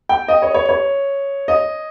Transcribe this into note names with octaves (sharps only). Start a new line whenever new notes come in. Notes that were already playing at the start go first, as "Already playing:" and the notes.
G5
D#5
C#5
C#5
C#5
D#5